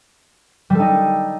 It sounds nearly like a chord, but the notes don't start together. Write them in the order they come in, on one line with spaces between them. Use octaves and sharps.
G3 A4 D#4